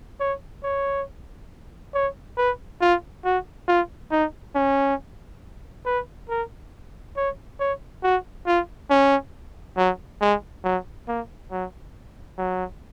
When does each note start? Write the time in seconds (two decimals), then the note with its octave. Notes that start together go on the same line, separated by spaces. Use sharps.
0.20 C#5
0.64 C#5
1.94 C#5
2.37 B4
2.81 F4
3.25 F#4
3.68 F4
4.11 D#4
4.55 C#4
5.86 B4
6.29 A#4
7.17 C#5
7.60 C#5
8.03 F#4
8.47 F4
8.90 C#4
9.77 F#3
10.21 G#3
10.64 F#3
11.08 A#3
11.51 F#3
12.38 F#3